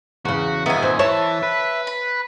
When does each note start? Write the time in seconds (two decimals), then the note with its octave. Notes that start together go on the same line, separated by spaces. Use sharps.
0.25 E2 C#3 F#4
0.66 D#2 A#2 B3 D#4 E5 G#5
0.82 C4
0.99 E3 C#5 E5 A5
1.43 B4
1.87 B5